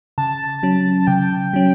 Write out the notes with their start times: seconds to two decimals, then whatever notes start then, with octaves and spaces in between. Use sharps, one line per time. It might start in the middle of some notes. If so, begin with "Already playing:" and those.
0.18 C#3 A5
0.63 F#3 C#4
1.07 C#3 G5
1.54 F#3 C#4